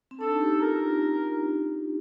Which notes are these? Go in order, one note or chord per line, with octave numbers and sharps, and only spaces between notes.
C4
D4 A4
D#4
G4
F4 A#4